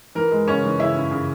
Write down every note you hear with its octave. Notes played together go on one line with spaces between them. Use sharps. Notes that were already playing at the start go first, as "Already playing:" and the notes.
E3 A#4
G#3
C#3 C#4 C#5
E3
C#3 E4 E5
C#3
C#3